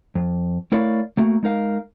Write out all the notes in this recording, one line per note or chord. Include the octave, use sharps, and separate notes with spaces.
F2
A3 E4 A#4 C#5 D5 F5
A3 A#3 F#4
G#3 D#4 A#4 F5